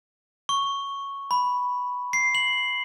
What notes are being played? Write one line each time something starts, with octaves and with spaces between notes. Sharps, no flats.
C#6
B5
C7
F#7